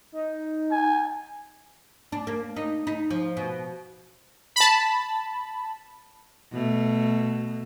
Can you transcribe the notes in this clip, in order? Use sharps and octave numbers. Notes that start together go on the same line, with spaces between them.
D#4
G#5
D4
A#3
D#4
D#4
F3
B2
A5 B5
B2 A3